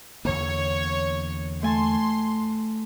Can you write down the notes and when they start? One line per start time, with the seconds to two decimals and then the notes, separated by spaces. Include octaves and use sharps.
0.25 E2 D3 A#3 C#5
1.63 A3 G#5 A5 C6